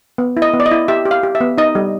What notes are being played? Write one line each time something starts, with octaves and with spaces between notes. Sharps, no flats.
B3
E4
D#5
B3
D5
D#5
E4
G4 E5
G4
F5
G4
E5
B3
D#4 D#5
G3